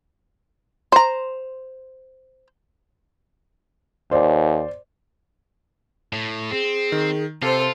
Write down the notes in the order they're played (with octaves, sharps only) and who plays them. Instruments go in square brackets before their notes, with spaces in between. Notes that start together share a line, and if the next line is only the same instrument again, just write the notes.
[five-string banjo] C5 A#5
[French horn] D#2 [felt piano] C5 D5
[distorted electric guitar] A2
[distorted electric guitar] C4 [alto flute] G#4
[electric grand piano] D#3
[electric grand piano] C3 [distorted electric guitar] F4 [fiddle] A4 C5